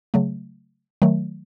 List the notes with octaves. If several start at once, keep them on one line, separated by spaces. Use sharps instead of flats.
C#3 F#3 A3
D#3 F#3 A3